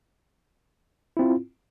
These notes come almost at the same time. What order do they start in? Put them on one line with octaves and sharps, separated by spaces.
E4 C4 F4